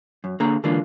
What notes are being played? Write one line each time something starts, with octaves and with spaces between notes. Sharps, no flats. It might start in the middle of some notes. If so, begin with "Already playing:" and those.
F#2
D3 A#3 G#4 A#5
D3 E3 G#3 A#3 D4 F4